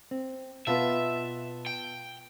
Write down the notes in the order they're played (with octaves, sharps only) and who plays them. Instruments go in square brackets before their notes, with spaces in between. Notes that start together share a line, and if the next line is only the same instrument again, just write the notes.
[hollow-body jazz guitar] C4
[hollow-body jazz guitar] B2 B4 [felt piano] B3 F4 A5 [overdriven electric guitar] E5
[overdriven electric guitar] G5